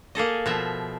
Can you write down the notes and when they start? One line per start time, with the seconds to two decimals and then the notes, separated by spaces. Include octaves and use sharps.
0.15 A#3 G#4 A4 D#5
0.46 B2 F3 E5